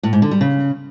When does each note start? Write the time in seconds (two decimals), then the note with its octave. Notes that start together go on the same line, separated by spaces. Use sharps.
0.03 A2
0.13 G#2
0.22 D3
0.31 G3
0.41 C#3